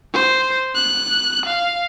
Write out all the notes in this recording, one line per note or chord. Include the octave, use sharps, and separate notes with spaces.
C5
F#6
F5